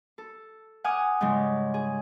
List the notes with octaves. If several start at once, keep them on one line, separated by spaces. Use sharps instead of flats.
A4
F#5 G#5 D6 D#6 F6
G#2 C#3 G3 G#3
G#4